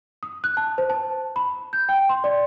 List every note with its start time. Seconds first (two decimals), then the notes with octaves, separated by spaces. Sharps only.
0.23 D#6
0.44 F#6
0.57 A5
0.78 C5
0.90 A5
1.36 B5
1.73 G6
1.89 G5
2.09 C6
2.24 D5